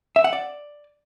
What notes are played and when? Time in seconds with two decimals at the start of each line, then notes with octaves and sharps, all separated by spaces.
0.16 E5
0.24 F#5
0.33 D5